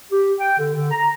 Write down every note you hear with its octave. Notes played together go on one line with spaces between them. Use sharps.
G4
G5
D3
D3
A#5